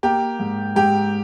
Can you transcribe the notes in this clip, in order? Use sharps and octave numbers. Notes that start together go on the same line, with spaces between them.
A#3 G4
G#2
G#2 G4